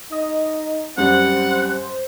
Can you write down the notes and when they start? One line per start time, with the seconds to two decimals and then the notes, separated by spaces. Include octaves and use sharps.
0.12 D#4 D#5
0.98 F#2 G3 C4 C5 F#5